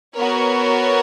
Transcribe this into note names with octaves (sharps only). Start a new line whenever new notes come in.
B3 F#4 A#4 C#5